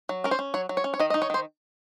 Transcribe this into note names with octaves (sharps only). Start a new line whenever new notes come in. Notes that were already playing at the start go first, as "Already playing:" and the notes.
F#3
C#4 A#4
C5
C#4
F#3 C#5
F#3
C#5
C#4
C#5
D#3 D#5
D#5
D#4
C#5
D#3 C5